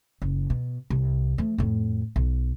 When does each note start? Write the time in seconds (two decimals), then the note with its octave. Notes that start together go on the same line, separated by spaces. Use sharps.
0.22 F#1
0.50 B2
0.90 C2
1.38 F3 A3
1.58 F2 A2
2.16 B1